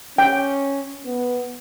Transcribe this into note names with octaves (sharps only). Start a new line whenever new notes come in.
C#4 G5
B3